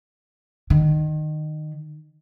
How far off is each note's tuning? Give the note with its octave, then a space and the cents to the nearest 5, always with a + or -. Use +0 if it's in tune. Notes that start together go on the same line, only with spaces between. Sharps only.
D#3 -20